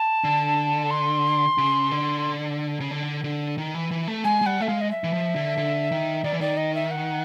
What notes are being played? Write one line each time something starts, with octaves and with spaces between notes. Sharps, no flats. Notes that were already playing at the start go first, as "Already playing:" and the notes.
Already playing: A5
D3
C6
C#3
D3
C#3
D3
D3
D#3
E3
E3
A3
G#3 G#5
G#3
G3 F#5
A3 E5
G#3 F5
D#5
E5
E3
F3
D3
D3
D#3
D#3 D5
E3
D#3 D5
D#5
E5
F#5